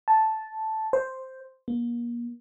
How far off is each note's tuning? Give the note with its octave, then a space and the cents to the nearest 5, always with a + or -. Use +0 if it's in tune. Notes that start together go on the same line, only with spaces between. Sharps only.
A5 -5
C5 +0
A#3 +35